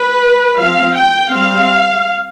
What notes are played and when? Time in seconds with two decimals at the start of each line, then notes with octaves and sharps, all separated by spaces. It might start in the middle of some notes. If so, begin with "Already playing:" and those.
Already playing: B4
0.57 F3 C4 F5
0.95 G5
1.32 G3 C4 F5